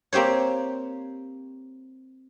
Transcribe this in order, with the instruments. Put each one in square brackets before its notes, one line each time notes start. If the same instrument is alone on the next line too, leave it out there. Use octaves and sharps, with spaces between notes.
[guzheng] A#3 C4 G4 C5 C#5